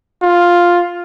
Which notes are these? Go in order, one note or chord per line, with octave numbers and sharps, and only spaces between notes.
F4